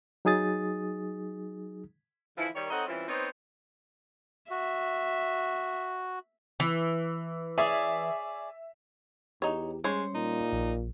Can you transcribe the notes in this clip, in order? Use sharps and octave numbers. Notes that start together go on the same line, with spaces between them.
F#3 D#4 G#4 D#6 A6
D3 E3 F3 E4
D#3 G3 C#5
C4 D#4 A4 C#5 D#5 F#5
E3 G3 C4 C#4 E4 F4
B3 C4 D#4 C5 C#5
F#4 E5
E3
G#4 C#5 D5 E5
E2 D#4 G4 C#5
G3 G#3 C#4 C5 C#5
A#2 D#4
A#1